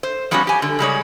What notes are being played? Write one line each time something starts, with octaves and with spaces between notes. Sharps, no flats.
C5
F3 G3 B3 C#4 F4 F#4
G4 G#5
D3
C#3 G3 G#3 C#5